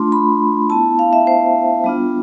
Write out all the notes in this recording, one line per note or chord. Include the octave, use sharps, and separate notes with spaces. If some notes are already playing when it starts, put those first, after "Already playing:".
Already playing: A3 D4 F4 C6
B5
B3 E4 A5
F5
E5
C5
G3 B3 D4 F4